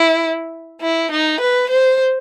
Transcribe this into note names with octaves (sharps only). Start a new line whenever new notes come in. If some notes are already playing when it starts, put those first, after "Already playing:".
Already playing: E4
E4
D#4
B4
C5